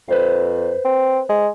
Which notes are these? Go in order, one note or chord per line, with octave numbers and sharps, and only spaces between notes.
F2 B4 C5 F5
C4
G#3